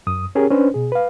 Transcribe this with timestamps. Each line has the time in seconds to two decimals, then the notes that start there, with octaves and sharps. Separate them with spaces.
0.07 F#2 D#6
0.35 C#4 G4 G#4 A#4 C#5
0.51 C#4 D4 B4 C5
0.74 B2 G#4
0.92 B4 F5